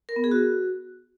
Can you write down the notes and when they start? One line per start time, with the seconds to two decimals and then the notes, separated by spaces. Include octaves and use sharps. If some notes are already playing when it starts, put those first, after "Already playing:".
0.09 A#4
0.16 B3
0.24 G#4
0.31 F#4